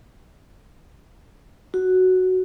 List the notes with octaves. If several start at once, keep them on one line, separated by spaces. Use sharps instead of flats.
F#4